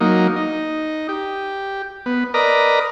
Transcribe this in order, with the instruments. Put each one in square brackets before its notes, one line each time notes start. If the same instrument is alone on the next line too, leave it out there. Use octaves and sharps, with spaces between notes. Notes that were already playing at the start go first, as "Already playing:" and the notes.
[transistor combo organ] F#3 A#3 D#4
D#4
G4
B3
A#4 B4 D5 D#5 A#5